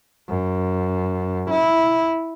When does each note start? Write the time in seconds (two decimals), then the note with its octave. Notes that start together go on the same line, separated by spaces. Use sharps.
0.28 F#2
1.50 E4